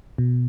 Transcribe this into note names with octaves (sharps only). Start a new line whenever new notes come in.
B2